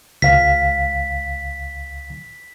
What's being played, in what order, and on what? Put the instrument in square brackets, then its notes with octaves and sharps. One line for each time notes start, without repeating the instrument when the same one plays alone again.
[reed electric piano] C#2 F5 [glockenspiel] B6